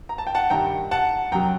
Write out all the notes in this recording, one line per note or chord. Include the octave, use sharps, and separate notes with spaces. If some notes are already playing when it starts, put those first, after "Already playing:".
A#5
A5
G5
F#5 A5
G2 D#3 G3 G5 A#5
F#5 A5
F#2 F#3 G5 A#5